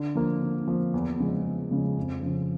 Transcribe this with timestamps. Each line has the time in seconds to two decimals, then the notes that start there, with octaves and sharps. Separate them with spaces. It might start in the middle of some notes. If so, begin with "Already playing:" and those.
Already playing: D3
0.15 F3 A#3
0.42 D3
0.68 F3 A#3
0.94 E2
1.19 C#3 F3 G#3
1.45 E2
1.71 C#3 F3 G#3
1.97 F2
2.23 C#3 F3